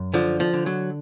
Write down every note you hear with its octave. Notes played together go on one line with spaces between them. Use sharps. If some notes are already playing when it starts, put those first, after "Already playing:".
Already playing: F#2
D3 F3
F3
D3
F#3